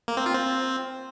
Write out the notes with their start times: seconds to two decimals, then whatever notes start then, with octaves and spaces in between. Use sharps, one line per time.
0.08 A#3
0.17 C4
0.26 F4
0.35 C4